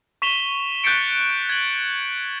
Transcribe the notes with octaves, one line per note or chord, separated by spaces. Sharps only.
C#6 B6 E7 F7 G7
F#6 G6 A6 B6 C#7 D7
G#6 F#7